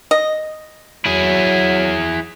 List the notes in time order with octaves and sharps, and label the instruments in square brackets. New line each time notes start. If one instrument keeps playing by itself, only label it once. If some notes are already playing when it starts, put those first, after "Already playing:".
[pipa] D#5
[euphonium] F#3 [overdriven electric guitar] E4 G#4